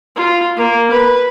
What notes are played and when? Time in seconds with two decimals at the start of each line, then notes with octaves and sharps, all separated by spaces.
0.16 F4
0.57 A#3
0.91 B4